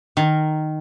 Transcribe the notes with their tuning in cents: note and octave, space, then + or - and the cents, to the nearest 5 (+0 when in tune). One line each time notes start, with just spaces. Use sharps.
D#3 -10 A#4 +0